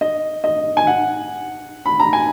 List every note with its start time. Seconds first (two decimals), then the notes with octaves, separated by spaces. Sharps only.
0.01 D#5
0.44 D#5
0.77 G#5
0.87 F#5
1.86 B5
2.00 A#5
2.13 G#5